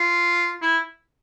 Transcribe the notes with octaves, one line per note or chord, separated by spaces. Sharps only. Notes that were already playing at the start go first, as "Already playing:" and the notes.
Already playing: F4
E4